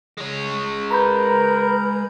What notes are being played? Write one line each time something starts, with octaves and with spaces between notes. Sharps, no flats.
G#3 C#5
A#4 B4 A#5 B5 G6